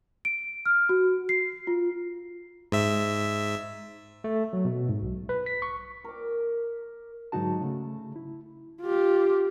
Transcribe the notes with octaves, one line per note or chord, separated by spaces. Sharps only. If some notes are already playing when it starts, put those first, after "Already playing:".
D7
F6
F#4
C7
F4
G#2 E5
A3
F#3
B2
G#2
B1
B4
B6
C#6
A#4 D6
G#2 D3 F#3 D#4 F#4 A5
C#3 A3
E4
F4 G4